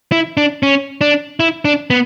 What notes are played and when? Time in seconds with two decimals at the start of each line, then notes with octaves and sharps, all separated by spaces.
0.12 E4
0.37 D4
0.63 C#4
1.01 D4
1.40 E4
1.65 D4
1.90 B3